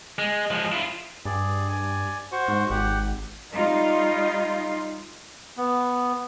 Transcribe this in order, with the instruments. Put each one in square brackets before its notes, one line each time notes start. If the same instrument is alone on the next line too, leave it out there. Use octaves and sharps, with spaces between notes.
[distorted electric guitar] G#3
F3 G#3
E4 F4
[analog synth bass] G2 [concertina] G#4 D5
[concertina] D5 G#5
F#4 C5 C#6
[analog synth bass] G#2
[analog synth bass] G#1 [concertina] G4 F#5
[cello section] G3 D#4 F4
[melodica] B3